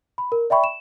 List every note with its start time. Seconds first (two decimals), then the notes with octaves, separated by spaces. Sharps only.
0.18 B5
0.32 A#4
0.50 D5 E5 G5 B5 C#6
0.64 E7